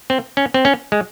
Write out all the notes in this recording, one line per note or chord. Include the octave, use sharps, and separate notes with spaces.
C4
C#4
C4
C#4
G#3